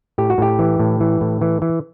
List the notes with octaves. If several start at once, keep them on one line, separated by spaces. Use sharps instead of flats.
A2 G4
F#4
A2 G4
E3
A2
E3
A2
E3
E3